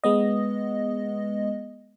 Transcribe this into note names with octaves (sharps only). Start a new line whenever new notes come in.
G#3 B3 D#5